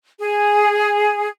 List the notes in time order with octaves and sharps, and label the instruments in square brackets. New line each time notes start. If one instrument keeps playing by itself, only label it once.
[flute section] G#4